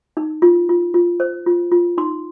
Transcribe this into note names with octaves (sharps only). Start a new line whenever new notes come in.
D#4
F4
F4
F4
C5
F4
F4
D#4 C6